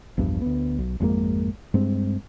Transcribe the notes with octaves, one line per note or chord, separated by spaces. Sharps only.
A#1 E2 G2
D2 B3
B1
G#1 F2 G#3 A#3
G2 G#3 C4